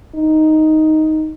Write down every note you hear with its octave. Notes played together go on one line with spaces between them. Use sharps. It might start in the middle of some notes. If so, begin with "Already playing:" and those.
D#4